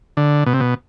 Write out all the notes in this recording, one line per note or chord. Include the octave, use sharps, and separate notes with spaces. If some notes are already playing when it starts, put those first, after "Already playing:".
D3
B2
C3
B2